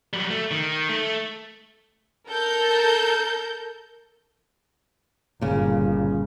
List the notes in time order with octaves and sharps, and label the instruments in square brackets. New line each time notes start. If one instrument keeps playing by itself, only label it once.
[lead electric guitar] F#3 G3
A3
D#3
A3
[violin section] A4 A#4 G6
[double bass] G1 [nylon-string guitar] A#2 C#3